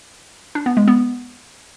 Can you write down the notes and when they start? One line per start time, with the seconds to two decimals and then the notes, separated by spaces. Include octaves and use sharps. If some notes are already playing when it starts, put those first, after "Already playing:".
0.55 D4
0.66 B3
0.77 G#3
0.88 B3